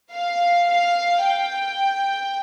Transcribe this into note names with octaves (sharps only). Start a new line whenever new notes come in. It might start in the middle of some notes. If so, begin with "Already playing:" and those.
F5
F5
G5